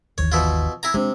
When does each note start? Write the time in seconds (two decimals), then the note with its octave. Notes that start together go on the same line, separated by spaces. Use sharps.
0.18 G1 D#2 E3 C#5
0.32 B2 E4 F4
0.83 E4 G#5 A#5
0.94 C3 G#3 D4